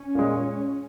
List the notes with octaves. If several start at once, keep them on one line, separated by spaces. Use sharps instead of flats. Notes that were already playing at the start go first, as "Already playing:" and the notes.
Already playing: C#4
A#2 G#3